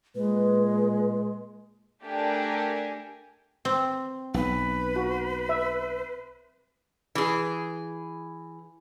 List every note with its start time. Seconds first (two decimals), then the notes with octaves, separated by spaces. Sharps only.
0.15 A#2 G#3 B4
2.03 A3 D4 G4 A4 A#4 G#5
3.65 C4
4.34 B1 B4
4.96 F#4
5.49 E5
7.15 E3 G#4